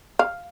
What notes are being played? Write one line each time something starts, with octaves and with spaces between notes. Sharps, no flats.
F5